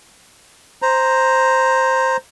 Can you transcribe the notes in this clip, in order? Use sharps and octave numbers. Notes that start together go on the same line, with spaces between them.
C5 A#5